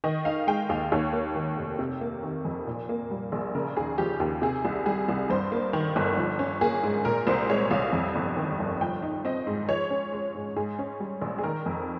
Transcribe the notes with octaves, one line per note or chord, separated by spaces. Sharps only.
D#3 D#5
D#4 F5
G#3 G5
D#2 F5
D#2 C#5
A#3
D#3
F1
C3
A#3
D#3
F2
A#2
A#3
G3
A#1
C#3 A#4
D#2 G#4
F3 G4
D#2 G4
C3 G#4
C2
G3 G#4
C2
G2 C5
A#3
D#3
G1
F3
C#4
A#3 G#4
G#2
A#2 A#4
C2 C5
G#3 C#5
C2 F5
F2
G1
D#3
G1
F3 G5
D#4
C4 D#5
G#2
F3 C#5
C#4
G#3
G#2
G#2 G#4
C#4
G3
A#1
G#4
D#3 A#4
F2